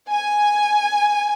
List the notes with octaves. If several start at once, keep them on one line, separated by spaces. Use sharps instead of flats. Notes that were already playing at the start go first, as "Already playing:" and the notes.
G#5